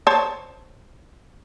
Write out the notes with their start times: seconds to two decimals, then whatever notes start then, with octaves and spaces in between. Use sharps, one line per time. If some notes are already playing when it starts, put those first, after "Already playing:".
0.07 C5 C#5 A5